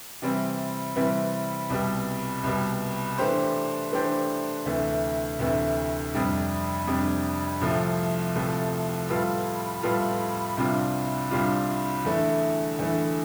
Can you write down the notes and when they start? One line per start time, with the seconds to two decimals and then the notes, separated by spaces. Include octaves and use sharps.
0.22 C3 E3 G3 C4 E4
0.96 C3 E3 G3 C4 E4
1.70 C2 B2 G3
2.44 C2 B2 G3
3.18 E3 A3 D4 G4 C5
3.92 E3 A3 D4 G4 C5
4.66 D2 C3 E3 A3 E4
5.39 D2 C3 E3 A3 E4
6.13 F2 C3 G3 D4
6.87 F2 C3 G3 D4
7.61 C2 C3 F3 A3
8.35 C2 C3 F3 A3
9.09 A2 G3 B3 F4 A4
9.83 A2 G3 B3 F4 A4
10.57 C2 C3 G3 D4 F4
11.31 C2 C3 G3 D4 F4
12.05 E2 D3 A3 E4
12.79 E2 D3 A3 E4